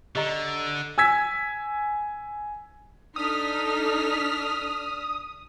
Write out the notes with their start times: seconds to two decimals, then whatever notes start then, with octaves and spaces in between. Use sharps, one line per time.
0.16 D3 G4 D#5 A#5
0.98 G#5 E6 G#6 B6
3.16 D4 D#4 A4 D#6 F6 B6